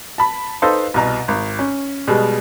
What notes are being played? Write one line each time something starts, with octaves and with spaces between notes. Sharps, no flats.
A5 B5
D#4 A4 B4 C5 F5 C6
C2 B2 A#5
G#1
C#4
B2 G3 G#3